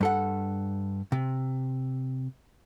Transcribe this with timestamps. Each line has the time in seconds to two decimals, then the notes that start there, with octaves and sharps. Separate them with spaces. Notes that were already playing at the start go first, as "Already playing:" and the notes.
0.01 G2 A4 F#5
1.12 C3